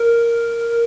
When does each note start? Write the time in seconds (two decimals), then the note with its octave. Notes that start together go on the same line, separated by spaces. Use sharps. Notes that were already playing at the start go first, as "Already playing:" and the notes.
Already playing: A#4
0.69 A#4